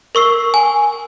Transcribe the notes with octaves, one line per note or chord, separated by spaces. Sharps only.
A#4 C#6 E6 C7
G#5